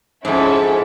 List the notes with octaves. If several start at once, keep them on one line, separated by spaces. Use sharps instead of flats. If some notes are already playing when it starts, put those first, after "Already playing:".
F2 G#2 C#4 E4 A4